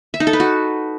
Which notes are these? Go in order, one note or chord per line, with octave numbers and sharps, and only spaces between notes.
E5
D#4
A4
B4
F#4